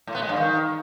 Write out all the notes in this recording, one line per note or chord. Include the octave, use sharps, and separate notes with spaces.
A2
B3
G#3
G2
D#3